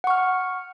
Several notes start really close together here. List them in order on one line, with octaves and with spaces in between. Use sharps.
F#5 C#6 F6